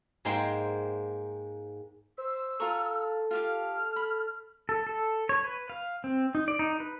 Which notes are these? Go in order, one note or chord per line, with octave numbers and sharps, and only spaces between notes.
G#2 G#3 A#3 C5 G5 C6
C5 E6
F4 A4 A#5 C#6
F4 G4 F5 F6
B5
A4
A4
C#5
B4
F5
C4
D#4
D5
D#4
B4